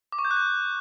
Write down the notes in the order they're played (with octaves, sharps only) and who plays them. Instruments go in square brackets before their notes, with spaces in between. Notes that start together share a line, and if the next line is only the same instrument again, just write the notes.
[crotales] D6
C#6
G6
F#6
G6